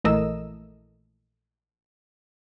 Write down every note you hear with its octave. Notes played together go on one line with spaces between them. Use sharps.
A#1 E3 A3 A#4 D#5 E6